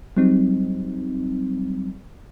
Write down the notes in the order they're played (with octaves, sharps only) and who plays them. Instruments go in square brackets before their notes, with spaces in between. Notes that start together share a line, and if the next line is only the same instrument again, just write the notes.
[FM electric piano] F#3 G3 C4 D#4